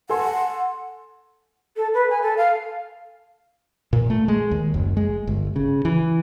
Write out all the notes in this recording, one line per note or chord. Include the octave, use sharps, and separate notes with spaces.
A4 F#5 G#5 C6
A4
B4
G#5
A4
F5
A#2
A3
G#3
D#2
F#1
G#3
G1
C#3
E3